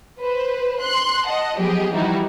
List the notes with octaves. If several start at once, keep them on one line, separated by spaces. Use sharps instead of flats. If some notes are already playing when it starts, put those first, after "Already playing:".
B4 C5
C6 F#6
D#5 F#5 A5
F3 F#3 B3 G4 G#4 D#5
E3 F3 G3 D#4 E4 F#4